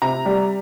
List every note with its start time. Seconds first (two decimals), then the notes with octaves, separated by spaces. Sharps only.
0.02 C3 A#5
0.25 G3